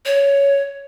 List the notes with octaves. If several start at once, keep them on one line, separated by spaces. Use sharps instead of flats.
C#5